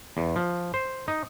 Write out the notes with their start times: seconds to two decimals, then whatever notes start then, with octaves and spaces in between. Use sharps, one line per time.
0.17 E2
0.36 F3
0.74 C5
1.08 D#4